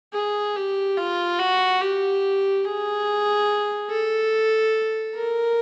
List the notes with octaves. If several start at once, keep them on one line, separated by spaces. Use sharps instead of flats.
G#4
G4
F4
F#4
G4
G#4
A4
A#4